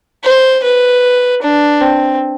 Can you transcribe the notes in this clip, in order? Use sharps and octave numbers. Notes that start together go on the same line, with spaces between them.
C5
B4
D4
C4